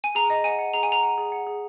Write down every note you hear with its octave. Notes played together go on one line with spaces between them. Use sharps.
G#5
G#4 A#5
D#5
F#5 G#5
F#5
G#4 A#5
G#5
F#5 A#5
F#5
G#4
F#5
G#4